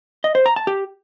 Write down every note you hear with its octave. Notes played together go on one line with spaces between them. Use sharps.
D#5
C5
A#5
A5
G4